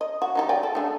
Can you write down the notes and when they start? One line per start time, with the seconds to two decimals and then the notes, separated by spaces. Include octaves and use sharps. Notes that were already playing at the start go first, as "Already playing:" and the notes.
0.01 D#5
0.22 F#4
0.35 F#3 D#4 G4
0.49 D5 G5 G#5
0.63 A4
0.75 A3 D4 G#4